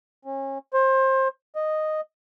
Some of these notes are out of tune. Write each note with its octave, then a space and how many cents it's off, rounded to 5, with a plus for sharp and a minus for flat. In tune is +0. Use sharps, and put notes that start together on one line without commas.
C#4 -30
C5 +25
D#5 -5